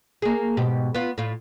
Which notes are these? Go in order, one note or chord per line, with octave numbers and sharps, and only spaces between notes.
A#3 G#4
G#2 B2 G4
B3 F4
A2 F4